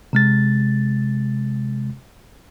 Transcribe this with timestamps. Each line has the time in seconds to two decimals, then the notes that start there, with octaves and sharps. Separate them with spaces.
0.13 C3 G#3 A6